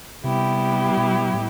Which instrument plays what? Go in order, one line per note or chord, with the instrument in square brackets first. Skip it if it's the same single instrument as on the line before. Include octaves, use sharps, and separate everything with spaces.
[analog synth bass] C3 [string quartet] G3 B3 E4 G4
[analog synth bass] B2
A2